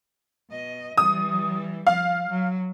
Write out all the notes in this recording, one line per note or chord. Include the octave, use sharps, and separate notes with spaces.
B2 D#5
E3 G3 D#6
F3 F5
F#3